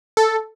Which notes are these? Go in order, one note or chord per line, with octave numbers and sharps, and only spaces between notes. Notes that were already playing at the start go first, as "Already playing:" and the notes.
A4